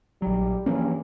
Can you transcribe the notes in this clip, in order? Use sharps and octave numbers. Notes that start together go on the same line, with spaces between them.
A#1 F#3 G3
G2 E3 F3 A#3 C#4